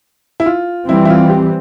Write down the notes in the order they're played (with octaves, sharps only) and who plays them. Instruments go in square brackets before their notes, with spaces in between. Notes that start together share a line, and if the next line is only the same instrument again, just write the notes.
[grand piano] E4
F4
[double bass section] E3 G3 C4 [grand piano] E4
[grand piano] E4
F4
G4